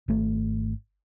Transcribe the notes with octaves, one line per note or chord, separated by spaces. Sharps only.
G#1 A3